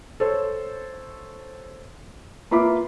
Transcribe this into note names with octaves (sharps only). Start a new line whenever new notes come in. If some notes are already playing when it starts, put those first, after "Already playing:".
A4 C5 C#5
A#3 F4 B4 E5 B5 D6